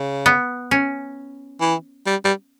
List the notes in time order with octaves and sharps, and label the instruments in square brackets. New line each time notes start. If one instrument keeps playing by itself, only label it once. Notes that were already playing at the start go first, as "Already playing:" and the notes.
Already playing: [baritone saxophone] C#3
[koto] B3
C#4
[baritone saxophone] E3
G3
G3